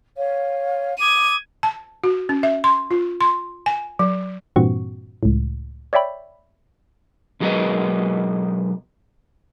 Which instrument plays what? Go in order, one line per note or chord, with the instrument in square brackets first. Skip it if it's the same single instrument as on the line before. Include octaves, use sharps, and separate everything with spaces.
[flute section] C#5 F5
[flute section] D6 D#6 [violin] G#6 D#7
[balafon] A5
F#4
C#4
E5
C6
F4
C6
G#5
F#3
[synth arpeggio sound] G2 A#2 E3 C4 F#4 C#6
C#2 A2
C#5 D5 E5 G5 B5
[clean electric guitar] B1 F#3 G#3 A#4 B4 D#5